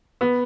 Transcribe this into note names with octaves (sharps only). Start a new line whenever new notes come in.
B3